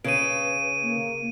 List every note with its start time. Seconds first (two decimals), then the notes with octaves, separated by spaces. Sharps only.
0.04 C#3 B4 D7 D#7
0.82 A#3